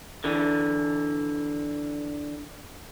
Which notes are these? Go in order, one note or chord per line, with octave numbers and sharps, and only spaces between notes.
D3 E3